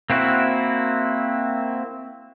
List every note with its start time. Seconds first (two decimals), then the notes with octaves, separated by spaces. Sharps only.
0.10 A#3 C4 E4 F#4